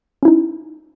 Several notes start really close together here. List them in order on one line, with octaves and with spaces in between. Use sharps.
C#4 E4 D#4